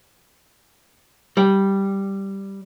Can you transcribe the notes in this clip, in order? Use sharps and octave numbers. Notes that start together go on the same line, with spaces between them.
G3